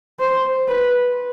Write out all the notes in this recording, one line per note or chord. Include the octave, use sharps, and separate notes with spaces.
C5
B4